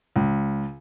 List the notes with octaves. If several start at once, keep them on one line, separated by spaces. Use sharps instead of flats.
C#2